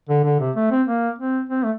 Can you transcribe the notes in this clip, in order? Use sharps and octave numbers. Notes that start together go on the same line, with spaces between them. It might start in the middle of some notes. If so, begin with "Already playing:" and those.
D3
D3
C3
A3
C4
A#3
C4
C4
A3